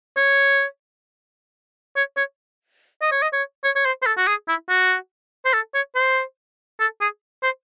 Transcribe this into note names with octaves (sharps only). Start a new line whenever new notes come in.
C#5
C#5
C#5
D#5
C#5
D#5
C#5
C#5
C#5
C5
C5
A4
F#4
G#4
E4
F#4
C5
A4
C#5
C5
A4
G#4
C5